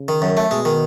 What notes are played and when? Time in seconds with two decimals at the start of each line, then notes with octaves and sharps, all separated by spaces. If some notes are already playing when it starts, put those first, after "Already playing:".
Already playing: C#3
0.08 D#3
0.22 F#2
0.37 A3
0.51 B2 G#3
0.65 D#3